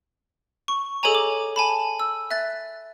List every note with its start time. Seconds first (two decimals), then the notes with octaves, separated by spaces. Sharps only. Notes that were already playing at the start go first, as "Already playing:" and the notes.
0.68 C#6
1.03 G#4 A4 C#5 D#5 G#5 A#5
1.15 D6
1.56 G#5 A5 B5
2.00 E6
2.31 E5 F#6 A6